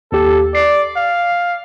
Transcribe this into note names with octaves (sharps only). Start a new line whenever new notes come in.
D#2 G4 A4
D5 C7
F5